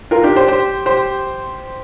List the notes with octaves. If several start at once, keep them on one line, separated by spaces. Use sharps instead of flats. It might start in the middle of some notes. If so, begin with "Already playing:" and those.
F4 A#4
D4 G4
G4 C5
G4 C5
G4 C5